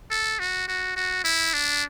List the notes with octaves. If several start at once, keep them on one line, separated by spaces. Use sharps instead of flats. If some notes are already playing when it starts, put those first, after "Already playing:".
A4
F#4
F#4
F#4
E4
D4